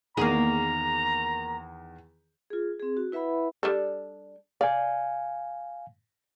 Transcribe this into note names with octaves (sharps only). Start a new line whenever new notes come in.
E2 D#3 A#3 G#4 A#5
F4 G#4
C4 G#4
F#4
E4 B4 E5 F#5 B5
G3 D4 A4
D5 F5 G#5